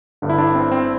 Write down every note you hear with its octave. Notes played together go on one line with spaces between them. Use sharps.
G1 G2 D3
E4
D4
C4
C4